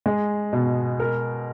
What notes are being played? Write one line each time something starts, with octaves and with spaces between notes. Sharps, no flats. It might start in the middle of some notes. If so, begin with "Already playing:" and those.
G#3
B2
A#4